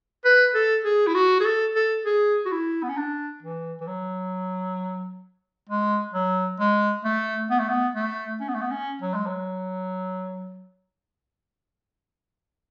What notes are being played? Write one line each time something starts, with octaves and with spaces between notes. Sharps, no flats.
B4
A4
G#4
E4
F#4
G#4
A4
A4
G#4
F#4
E4
B3
C#4
D4
E3
E3
F#3
G#3
F#3
G#3
A3
B3
A3
B3
A3
C#4
B3
A3
B3
C#4
F#3
G#3
F#3